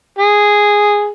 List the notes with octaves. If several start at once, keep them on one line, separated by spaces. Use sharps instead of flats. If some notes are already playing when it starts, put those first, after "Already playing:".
G#4